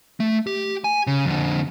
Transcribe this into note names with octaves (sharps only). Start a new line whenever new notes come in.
A3
G4
G#5
C#3
F2 D3